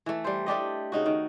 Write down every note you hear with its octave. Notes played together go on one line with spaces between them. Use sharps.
E3 A3
G3 C5
A3 D4 G4 D#5
C#3 D#4 F#4
D#3